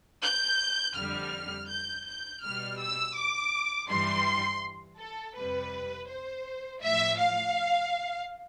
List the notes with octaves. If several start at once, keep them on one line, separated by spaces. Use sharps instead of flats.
G6
F2 D3 G3 F6
G6
G6
B2 G3 F6
E6
D6
G2 E3 G3 C6
A4
F2 C3 G3 B4
C5
A2 F3 E5
F5